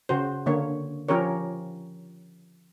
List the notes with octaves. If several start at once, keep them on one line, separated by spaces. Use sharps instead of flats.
C#3 F#4 C5
D3 A#3 C#5
F3 C#4 G4 A#4 C#5